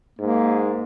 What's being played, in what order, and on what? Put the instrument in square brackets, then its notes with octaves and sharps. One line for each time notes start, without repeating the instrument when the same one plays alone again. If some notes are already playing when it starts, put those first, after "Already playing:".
[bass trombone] G#2 [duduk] A#3